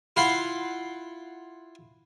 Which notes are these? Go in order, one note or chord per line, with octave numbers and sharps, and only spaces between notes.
E4 F4 F5 F#5 C6